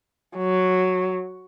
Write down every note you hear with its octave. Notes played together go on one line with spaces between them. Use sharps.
F#3